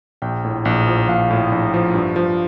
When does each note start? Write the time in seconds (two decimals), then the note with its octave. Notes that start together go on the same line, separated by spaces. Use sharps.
0.22 A#1 G5
0.45 A2
0.65 A#1
0.87 F3
1.09 A#1 F5
1.30 A2
1.52 A#1
1.74 F3
1.94 G2
2.16 F3